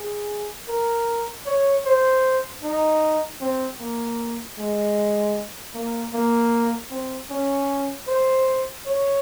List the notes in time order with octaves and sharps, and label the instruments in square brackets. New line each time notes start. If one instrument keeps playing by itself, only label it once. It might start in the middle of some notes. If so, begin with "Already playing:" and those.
Already playing: [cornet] G#4
A#4
C#5
C5
D#4
C4
A#3
G#3
A#3
A#3
C4
C#4
C5
C#5